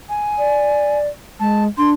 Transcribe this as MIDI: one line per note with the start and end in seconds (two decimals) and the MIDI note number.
0.09 0.98 80
0.38 1.08 74
1.40 1.67 56
1.40 1.64 81
1.78 1.94 62
1.78 1.90 84